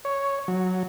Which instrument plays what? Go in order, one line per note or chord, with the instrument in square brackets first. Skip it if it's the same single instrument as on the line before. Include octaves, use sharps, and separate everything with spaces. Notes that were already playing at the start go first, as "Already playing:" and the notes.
[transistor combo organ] C#5
F#3